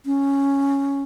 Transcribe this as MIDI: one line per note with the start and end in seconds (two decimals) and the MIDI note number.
0.06 1.03 61